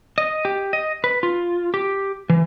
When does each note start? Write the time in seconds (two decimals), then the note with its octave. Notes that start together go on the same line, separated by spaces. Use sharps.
0.18 D#5
0.45 G4
0.73 D#5
1.04 B4
1.23 F4
1.74 G4
2.30 E3